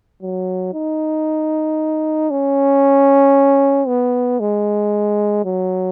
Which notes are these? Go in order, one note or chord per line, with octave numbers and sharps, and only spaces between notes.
F#3
D#4
C#4
B3
G#3
F#3